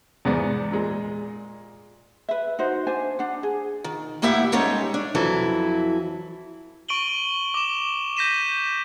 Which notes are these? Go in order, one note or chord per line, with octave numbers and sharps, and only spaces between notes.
E2 G#2 B3 D5
A#2 G#3
B4 E5
D#4 F#4 C5
D4 C5 G#5
D4 F#5
G#4
D#3
A2 A#3 E4 G4 E5 F#5
G3 G#3 C#4 D#4 A4 C#5
D4
F2 E3 F#3 E4 A4
C#6 D7 D#7 F#7 G7
D6 E7
G6 A#6 B6 D#7 E7